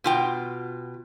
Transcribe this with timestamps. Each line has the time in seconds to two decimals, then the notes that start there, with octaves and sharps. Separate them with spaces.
0.04 B2 F4 G5